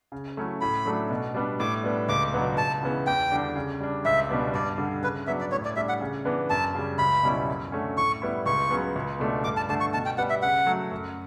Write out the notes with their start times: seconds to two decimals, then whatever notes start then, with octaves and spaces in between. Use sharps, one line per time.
0.12 C#3
0.37 F#3 A3 C#4 E4
0.61 A2 B5
0.85 F#3 A3 D4
1.10 B2
1.34 G3 B3 D4
1.60 A2 D6
1.83 G3 B3 D4
2.09 C#2 D6
2.33 B2 F#3 B3 D4
2.57 C#2 A5
2.83 C#3 E3 B3 E4
3.07 E2 G5
3.32 D3 G3 D4
3.56 C#3
3.81 G3 D4
4.05 C#2 E5
4.29 B2 G3 B3 D4
4.53 G2 D5
4.78 D3 G3
5.02 C#3 B4
5.27 F#3 B3 D4 E5
5.40 D5
5.52 A2 C#5
5.65 D5
5.76 G3 D4 E5
5.89 F#5
6.01 C#3
6.25 E3 B3 D4
6.50 F#2 A5
6.75 C#3 G3
6.98 C#2 B5
7.23 B2 G3 C#4 E4
7.48 F#2
7.72 D3 A3 C#4
7.97 A2 C#6
8.22 G3 B3 E4
8.46 C#2 C#6
8.70 C#3 F#3 B3
8.96 C#2
9.20 B2 A3 D4
9.44 G2 D6
9.57 A5
9.69 D3 A3 A5
9.81 C#6
9.94 B2 A5
10.05 G5
10.18 G3 B3 F#5
10.30 E5
10.42 C#3 F#5
10.66 F#3 A3
10.91 F#2